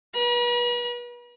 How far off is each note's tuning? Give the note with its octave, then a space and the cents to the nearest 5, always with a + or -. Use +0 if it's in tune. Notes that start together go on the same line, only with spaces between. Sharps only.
B4 -35 B5 -45